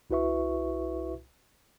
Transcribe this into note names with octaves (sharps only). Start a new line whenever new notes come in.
C2 E4 F#4 B4 E5 C#6